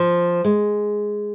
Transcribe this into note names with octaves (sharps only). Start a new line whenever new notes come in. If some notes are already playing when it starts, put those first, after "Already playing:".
Already playing: F3
G#3